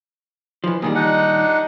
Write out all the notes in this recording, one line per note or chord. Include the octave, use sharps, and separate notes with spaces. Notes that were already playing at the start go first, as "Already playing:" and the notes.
E3 F3
A#2 D#3 G3 G#4
D4 D#4 F#5